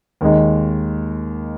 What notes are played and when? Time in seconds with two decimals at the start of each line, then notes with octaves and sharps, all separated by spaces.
0.21 D#2 D#3 G#3 D#4